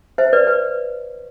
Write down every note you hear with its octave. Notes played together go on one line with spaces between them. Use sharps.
C5 E5
B4 D5
B4